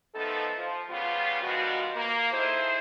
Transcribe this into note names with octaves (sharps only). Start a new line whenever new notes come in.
F3 A3 B3 D#4 A4
F3
C#3 G3 B3 F4
D#3 F3 G3 G#3 B3 F#4
A#3
D#4 E4 G#4 A4 C5